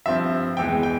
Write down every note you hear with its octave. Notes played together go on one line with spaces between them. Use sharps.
G2 F3 C4 E5
E2 E3 G#3 G5
G5